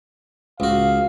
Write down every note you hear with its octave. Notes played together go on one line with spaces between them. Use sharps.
C#2 F#4 F5